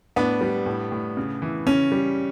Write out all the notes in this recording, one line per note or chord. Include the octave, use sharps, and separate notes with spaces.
A2 B3 D4
G3
A2
A2
C#3
E3
C#3 C#4
G3